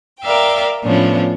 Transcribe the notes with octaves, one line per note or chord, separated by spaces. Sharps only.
A#4 D5 E5 F5 G5
A2 F3 B3 C#4 D4